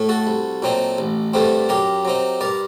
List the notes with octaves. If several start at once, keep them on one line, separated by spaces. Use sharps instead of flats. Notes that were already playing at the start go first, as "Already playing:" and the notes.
Already playing: A2 A3
F#4 A4
C2
A#2 F#3 C4 D#4
A1
G2 D3 A3 C4
F#2 G4 A#4
F#3 C4 D#4
G2 A#4 D5